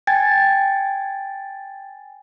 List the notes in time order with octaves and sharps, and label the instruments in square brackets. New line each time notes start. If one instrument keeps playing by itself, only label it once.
[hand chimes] G5 G#5 G#6 A6